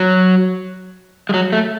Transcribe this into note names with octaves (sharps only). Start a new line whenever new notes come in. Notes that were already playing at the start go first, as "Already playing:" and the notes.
Already playing: F#3
G#3
F#3
A3